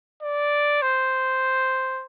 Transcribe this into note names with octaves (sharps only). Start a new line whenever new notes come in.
D5
C5